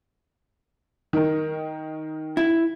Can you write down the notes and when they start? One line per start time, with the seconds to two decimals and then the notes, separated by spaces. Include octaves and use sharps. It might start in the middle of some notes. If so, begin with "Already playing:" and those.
1.13 D#3 D#4 A#4
2.37 E4